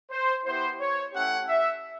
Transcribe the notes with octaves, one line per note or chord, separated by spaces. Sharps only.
C5
B3 E4 G4 C5
C#5
A3 C#4 E4 G4 F#5
E5